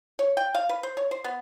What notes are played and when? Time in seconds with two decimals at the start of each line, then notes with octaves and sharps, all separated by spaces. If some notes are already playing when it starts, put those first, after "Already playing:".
0.19 C#5
0.37 G5
0.55 F5
0.69 B4
0.83 C5
0.97 C#5
1.11 C5
1.24 B3